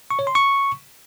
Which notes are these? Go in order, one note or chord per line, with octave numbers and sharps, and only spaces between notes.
C#6
C#5
C6
C#6